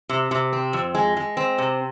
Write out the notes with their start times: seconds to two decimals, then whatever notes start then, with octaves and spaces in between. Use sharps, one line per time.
0.09 C3
0.31 C3
0.53 C4
0.73 F2
0.95 G#3
1.17 G#3
1.37 C4
1.58 C3